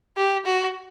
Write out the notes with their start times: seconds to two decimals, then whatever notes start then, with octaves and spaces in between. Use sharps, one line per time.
0.17 G4
0.45 F#4